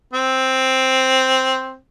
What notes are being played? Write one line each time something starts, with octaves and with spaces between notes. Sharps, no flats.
C4